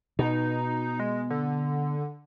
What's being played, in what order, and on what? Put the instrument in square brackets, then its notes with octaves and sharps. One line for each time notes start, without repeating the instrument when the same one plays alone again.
[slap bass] B2 [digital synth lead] D#4
[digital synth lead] G#3
D3